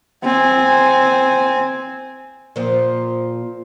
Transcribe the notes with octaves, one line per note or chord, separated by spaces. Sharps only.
C4 G#5
A#2 F3